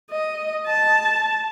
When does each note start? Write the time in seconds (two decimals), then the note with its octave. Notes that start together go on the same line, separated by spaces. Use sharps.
0.11 D#5
0.67 A5